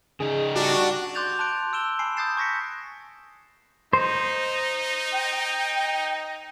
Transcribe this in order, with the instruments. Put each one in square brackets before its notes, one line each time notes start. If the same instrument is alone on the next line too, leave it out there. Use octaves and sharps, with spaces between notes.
[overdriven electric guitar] C#3 D#4 [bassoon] G#4
[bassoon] G3 [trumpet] D4 [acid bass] F#4
[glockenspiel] C6 D6 F#6 G6 A6 F7
A5 C6 F#6 D7
E6 D7 E7 G7
G#5 A5 B5 C7 D7
D#6 F#6 G6 A6 C7 E7
C#6 G#6 A#6 B6 C#7
[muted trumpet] D#4 [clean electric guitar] C5
[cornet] G5